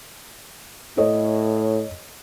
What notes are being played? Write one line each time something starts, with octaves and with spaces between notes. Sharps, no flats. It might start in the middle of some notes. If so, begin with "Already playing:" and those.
A2 A4 C#5 D#5